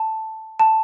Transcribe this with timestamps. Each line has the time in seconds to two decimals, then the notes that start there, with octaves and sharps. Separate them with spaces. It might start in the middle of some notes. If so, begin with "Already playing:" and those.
Already playing: A5
0.59 A5